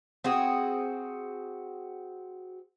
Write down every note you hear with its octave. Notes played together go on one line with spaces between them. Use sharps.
C4 F#4 G#4